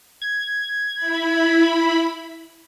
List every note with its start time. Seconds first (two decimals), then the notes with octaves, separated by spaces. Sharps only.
0.22 G#6
0.95 E4 B5